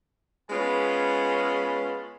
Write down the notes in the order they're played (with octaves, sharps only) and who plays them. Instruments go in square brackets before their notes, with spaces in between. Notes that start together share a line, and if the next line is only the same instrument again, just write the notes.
[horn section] G#3 B3 C#4 F4 A5 B5